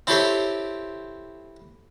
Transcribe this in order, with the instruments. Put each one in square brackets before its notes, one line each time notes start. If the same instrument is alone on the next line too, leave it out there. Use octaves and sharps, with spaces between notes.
[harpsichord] C4 E4 G4 A4 C5 C#5